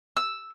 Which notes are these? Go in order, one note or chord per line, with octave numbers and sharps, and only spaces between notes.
E6